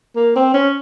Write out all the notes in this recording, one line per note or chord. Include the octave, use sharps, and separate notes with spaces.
A#3
C4
C#4